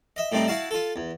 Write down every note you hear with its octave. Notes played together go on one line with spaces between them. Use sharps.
D#5 E5
A2 G3 A3 C4 D#4
E4 F#4 F5 A5
F4 A4
E2